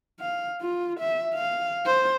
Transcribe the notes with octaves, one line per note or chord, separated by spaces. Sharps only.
F5
F4
E5
F5
C5